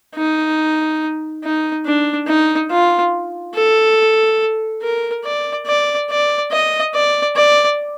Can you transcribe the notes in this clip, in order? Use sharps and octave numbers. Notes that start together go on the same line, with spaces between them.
D#4
D#4
D4
D#4
F4
A4
A#4
D5
D5
D5
D#5
D5
D5